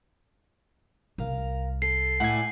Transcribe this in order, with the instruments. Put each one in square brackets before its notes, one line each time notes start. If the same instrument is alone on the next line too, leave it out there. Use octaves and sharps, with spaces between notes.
[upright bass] C2 [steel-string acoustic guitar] A#4 F5
[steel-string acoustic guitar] A4 [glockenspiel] C7
[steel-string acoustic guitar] A2 D5 E5 [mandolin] F#5 G#5